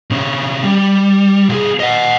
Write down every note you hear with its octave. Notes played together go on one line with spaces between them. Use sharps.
C3 C#4
G3
C2 G#4
D#5 F#5